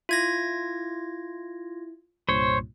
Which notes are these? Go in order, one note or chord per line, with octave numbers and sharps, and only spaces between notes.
E4 F4 G#6 A#6
C2 G2 A#2 C5 C#5